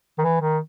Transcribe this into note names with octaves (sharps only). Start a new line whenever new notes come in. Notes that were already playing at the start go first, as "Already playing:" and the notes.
D#3
E3
D#3